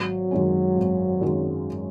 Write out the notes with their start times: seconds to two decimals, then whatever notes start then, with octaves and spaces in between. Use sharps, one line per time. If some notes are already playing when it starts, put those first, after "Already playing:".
Already playing: G#1 F#3
0.31 F#2 D#3 G#3 C#4
0.77 G#1
1.21 F#2 D#3 G#3 C#4